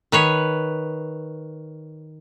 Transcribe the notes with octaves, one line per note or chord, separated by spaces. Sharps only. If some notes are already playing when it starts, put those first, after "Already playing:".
D#3 B4 C#5